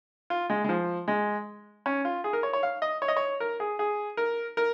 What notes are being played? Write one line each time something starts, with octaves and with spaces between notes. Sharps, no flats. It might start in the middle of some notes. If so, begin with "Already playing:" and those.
F4
G#3
G#3
F3
G#3
C#4
F4
G#4
A#4
C#5
C#5
F5
D#5
C#5
D#5
C#5
A#4
G#4
G#4
A#4
A#4